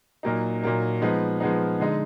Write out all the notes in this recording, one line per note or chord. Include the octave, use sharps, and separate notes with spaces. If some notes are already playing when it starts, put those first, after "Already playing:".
A#2 F#3 A#3 D#4
A#2 F#3 A#3 D#4
F3 G#3 B3 D#4
F3 G#3 B3 D#4
D3 G#3 D#4